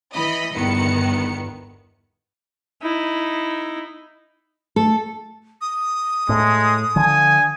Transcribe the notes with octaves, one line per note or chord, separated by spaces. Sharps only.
E3 D#5 B5 D#6
G1 E2 D#3 B3 C#7
D#4 E4
A3 A4
D#6
A2 G#3
D3 F3 G#5